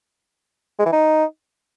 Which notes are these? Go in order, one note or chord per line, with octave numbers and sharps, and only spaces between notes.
G#3
E3
D#4